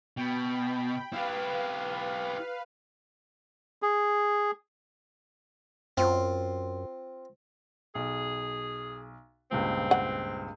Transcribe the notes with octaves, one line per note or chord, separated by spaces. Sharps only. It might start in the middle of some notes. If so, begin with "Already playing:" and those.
B2 G5 B5
E4 G4 B4 F5
G#4
F#2 C4 F4
B1 G#4
C#2 G2 A#2 C4
F#5